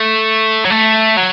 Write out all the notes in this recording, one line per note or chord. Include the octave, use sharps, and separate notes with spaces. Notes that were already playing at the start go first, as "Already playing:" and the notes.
Already playing: A3
F#3
A3
F#3